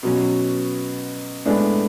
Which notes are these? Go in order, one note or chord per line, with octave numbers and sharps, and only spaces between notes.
B2 F#3 C#4
A2 G#3 B3 D4